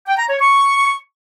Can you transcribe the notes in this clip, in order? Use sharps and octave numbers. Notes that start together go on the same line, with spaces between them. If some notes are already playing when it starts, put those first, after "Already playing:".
G5
A#5
C#5
C#6